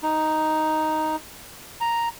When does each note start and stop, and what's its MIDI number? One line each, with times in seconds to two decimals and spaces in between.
0.03 1.16 63
1.81 2.08 82